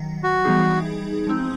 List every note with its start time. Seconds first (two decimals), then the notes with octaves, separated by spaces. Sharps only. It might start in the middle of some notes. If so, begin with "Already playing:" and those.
Already playing: D#3 F#3
0.23 F#4
0.45 E3 G3 B3 D#4 G#4
1.27 F3 G#3 C4 D#4